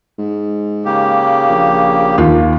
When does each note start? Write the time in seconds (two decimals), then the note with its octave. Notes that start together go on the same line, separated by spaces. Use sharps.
0.19 G#2
0.85 C#3 A#3 G4
1.49 A#1
2.18 D#2 F4